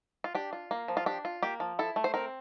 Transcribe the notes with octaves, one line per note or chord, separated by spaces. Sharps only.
F4
D4 G4
F4
A#3
F3
F4
D4 G4
F4
A#3 G4
F3
E4 A4
A3
C5
C4 A#4